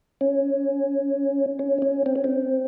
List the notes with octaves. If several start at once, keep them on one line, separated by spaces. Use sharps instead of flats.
C#4
C#4
C#4
C4
C#4
C4